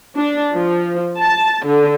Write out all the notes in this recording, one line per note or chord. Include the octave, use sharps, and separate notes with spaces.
D4
F3
A5
D3